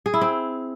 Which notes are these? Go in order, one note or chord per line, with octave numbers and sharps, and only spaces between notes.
G#4
E4
C4